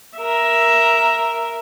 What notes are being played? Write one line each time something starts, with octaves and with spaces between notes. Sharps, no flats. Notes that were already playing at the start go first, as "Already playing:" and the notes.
A#4 E5